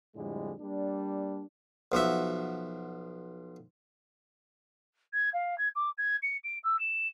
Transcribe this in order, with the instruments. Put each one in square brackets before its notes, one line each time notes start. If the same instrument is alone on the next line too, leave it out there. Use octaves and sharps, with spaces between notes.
[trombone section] F2 A2 D3 G3 G#3
G3 A#3 D4
[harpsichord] B1 F3 F#4 E5
[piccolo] G#6
F5
G#6
D6
G#6
C#7
D7
E6
E7